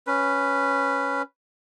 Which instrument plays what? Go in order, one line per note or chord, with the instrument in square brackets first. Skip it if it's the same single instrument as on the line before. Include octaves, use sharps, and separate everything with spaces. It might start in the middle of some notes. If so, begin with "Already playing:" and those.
[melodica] C#4 B4